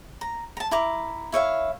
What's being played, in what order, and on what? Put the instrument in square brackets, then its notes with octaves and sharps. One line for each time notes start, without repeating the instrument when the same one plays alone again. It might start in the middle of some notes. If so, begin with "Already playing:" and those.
[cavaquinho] A#5
A5 A#5
E4 A#5 D6
E4 C#5 E5 F5